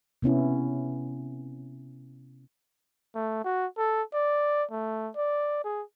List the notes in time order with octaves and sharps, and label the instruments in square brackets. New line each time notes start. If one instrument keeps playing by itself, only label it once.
[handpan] C3 B3 C#4 E4
[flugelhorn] A3
F#4
A4
D5
A3
D5
G#4